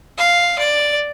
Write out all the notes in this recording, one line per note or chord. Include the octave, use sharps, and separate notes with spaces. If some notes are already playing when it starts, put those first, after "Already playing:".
F5
D5